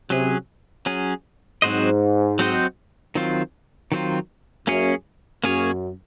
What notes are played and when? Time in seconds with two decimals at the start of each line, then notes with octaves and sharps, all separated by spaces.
0.10 C3 F#3 C#4 G#4
0.86 F#3 C#4 G#4
1.62 G#2 F#3 C4 F#4 C5 D#5
2.39 F#3 C4 F#4 C5 D#5
3.15 D#3 F#3 C4 F4
3.92 D#3 F#3 C4 F4
4.67 F#2 A#3 C#4 G#4 C#5
5.44 F#2 A#3 C#4 G#4 C#5